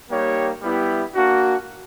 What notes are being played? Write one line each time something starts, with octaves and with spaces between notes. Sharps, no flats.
G3 A#3 D#4 G4 C#5
G3 B3 E4 G4
A#3 D4 F#4